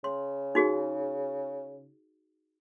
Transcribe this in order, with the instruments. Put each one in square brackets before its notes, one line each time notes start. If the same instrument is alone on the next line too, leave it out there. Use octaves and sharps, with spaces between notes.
[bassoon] C#3 [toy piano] C6
[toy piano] D#4 F#4 G#4